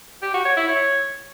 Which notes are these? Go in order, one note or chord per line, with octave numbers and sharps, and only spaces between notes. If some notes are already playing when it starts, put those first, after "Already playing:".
G4
F#4
C#5
E4
C#5